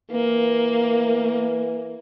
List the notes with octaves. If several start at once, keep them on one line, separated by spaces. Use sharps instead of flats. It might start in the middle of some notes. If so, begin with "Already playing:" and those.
E3 A#3